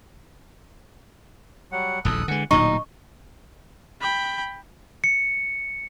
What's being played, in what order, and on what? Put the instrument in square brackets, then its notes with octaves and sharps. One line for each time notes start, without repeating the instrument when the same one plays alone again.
[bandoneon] F#3 G3 F#5
[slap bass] D#1 A#1 E2 [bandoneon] A4 D#6 F#6
[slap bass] D3 G#3 [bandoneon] E3 F#5
[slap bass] D1 A#2 F#3 [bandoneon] D#3 [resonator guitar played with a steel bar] D#4 [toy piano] C#6
[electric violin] G5 B5
[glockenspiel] C#7